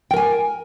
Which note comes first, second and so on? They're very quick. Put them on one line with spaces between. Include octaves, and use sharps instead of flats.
G5 A#4 G#5